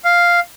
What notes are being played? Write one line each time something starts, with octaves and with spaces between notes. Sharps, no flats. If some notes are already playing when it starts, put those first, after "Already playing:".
F5